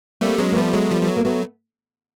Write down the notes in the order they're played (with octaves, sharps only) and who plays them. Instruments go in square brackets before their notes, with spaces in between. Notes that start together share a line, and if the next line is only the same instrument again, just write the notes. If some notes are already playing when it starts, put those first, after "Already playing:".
[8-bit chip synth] G3 A3 [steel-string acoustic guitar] A#3 C4
[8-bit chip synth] F#3 G#3 [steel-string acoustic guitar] B3 C#4
[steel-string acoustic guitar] A#3
[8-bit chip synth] F3 G3 [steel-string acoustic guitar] A3 B3
[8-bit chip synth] F#3 G#3
F3 G3
G3
F#3
[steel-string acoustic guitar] A#3
[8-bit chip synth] F#3 [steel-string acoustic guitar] A3 B3